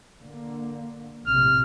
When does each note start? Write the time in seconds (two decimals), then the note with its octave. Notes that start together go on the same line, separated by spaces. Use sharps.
0.19 D3 A#3
1.27 A#1 A2 C3 F6